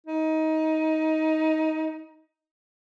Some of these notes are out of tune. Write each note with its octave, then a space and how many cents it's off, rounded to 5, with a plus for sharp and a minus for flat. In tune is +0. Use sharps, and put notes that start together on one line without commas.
D#4 +20